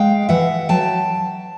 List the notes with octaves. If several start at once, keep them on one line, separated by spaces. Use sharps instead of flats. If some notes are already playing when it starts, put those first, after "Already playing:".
Already playing: G#3 F5 G5
E3 E5 F#5
F#3 G5 A5